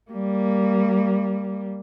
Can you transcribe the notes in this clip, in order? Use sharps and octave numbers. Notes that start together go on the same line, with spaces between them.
G3 A#3